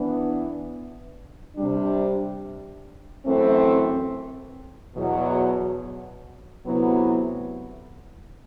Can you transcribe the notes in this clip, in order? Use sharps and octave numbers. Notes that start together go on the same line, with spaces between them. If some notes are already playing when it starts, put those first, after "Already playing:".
Already playing: E3 B3 D4
C3 G3 D4
F#2 E3 A3 C4
E2 B2 F#3
D2 C3 F#3 B3 E4